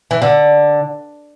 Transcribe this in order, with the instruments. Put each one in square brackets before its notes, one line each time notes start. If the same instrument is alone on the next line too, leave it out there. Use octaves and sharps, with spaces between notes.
[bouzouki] E3
D3